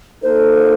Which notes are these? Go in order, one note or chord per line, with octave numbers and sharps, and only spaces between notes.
A#3 D#4 A4 C5